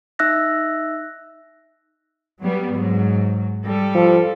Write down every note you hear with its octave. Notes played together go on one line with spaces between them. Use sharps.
D#4 E5 E6 F#6 A#6
F#3 G3 B3
G#2 F#3
G3 A4
F3